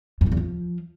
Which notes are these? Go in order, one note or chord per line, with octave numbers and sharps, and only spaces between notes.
F#2
E3
E2
F3